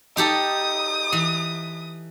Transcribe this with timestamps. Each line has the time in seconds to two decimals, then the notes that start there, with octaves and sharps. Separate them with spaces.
0.17 D#4 G4 A4 D#6
1.12 E3